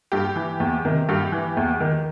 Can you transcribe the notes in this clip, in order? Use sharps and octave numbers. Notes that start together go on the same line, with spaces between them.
G2 G4
E3
E2
C3 D#3
G2 G4
E3
E2
D#3